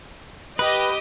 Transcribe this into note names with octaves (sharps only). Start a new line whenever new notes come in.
G4 B4 D#5